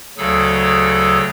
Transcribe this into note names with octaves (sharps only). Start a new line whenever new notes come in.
D2 C#3 F#3 G#4 A4 E6